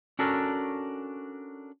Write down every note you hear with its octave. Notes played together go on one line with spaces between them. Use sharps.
C#4 D4 F#4 A4 A#4